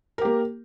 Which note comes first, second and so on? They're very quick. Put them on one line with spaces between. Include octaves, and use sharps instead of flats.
A#4 G4 A#3